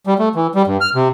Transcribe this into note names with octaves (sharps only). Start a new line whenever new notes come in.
G3
A3
E3
G3
G2
F6
C3